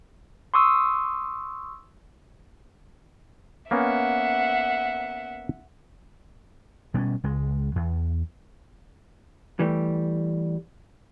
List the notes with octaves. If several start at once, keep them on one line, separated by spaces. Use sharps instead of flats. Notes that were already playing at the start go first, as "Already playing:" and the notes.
C6 C#6 D#6 E6
A#3 B3 C#4 E5 F#5
B2 G3 G#3 C#4
C#2 G#3
E2
E3 G3 A3